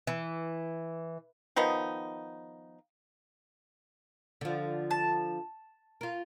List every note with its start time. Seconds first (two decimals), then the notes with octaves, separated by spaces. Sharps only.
0.07 E3
1.56 D#3 F3 B3 D#4
4.41 D3 F3
4.91 A5
6.01 F4 A#4